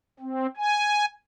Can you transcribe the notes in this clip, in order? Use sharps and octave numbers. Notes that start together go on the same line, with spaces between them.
C4
G#5